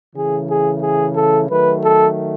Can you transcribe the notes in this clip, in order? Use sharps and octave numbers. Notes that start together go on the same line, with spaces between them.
C#3 E3 A3 G#4
G#4
G#4
A4
D#3 F#3 A3 B4
A4